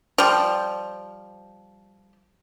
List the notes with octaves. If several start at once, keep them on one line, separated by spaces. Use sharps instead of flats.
F3 G3